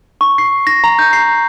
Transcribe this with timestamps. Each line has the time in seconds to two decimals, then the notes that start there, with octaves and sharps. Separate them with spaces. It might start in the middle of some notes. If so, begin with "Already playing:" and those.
0.21 C#6
0.38 C7
0.67 A#6
0.84 A#5
0.99 G6
1.13 C7